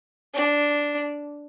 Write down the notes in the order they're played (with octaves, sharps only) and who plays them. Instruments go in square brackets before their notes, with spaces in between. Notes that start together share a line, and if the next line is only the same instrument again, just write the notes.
[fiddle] D4